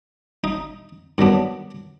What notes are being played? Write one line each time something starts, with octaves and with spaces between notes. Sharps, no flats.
D#4
G2 D#3 F#3 B3 D4